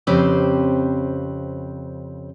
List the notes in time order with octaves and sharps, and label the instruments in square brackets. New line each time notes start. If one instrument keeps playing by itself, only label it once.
[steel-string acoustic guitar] F2 C#3 C4 G4 B4 C5